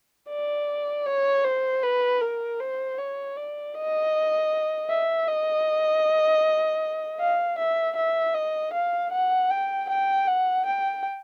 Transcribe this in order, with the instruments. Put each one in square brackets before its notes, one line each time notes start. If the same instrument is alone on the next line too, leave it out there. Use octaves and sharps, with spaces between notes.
[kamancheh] D5
C#5
C5
B4
A#4
C5
C#5
D5
D#5
E5
D#5
F5
E5
E5
D#5
F5
F#5
G5
G5
F#5
G5